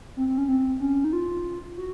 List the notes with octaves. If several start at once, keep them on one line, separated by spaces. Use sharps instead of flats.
C4
C4
C#4
C4
C#4
D#4
F4
F#4